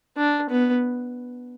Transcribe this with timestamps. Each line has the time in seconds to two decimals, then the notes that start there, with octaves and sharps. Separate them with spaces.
0.17 D4
0.50 B3